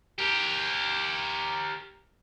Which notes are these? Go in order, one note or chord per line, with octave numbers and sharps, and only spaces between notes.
G4 A#4